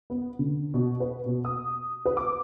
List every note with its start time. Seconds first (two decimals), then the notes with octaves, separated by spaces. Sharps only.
0.10 B3
0.39 D3
0.74 B2
1.00 B4
1.26 B2
1.45 D#6
2.06 B4
2.17 D6